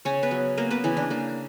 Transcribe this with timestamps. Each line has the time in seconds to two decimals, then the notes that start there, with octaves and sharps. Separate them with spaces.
0.05 C#3 C#4 C#5
0.23 B3 B4
0.31 F#3
0.57 A#3 B3 A#4
0.71 B3 B4
0.84 C#3 E3 E4
0.97 D4
1.10 A#3 D4